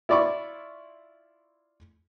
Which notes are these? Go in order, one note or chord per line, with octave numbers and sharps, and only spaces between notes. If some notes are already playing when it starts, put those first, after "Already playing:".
E4 F4 D5 B5 C#6